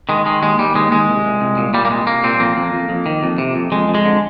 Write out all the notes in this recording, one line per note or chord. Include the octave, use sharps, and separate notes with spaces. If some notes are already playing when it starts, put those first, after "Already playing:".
D#3 G#3
D#3 G#3
D#2 G#3
D#2 G3
D#2 G#3
D#2 G#3
C2
C2
C2
A#2
A#2 G3
A#3
C2 G#3
C2 A#3
A#2 C4
F2 A#3
F2
F2
F2
D#3
F2
C3
F2
F2 G#3
F2
G#3
D3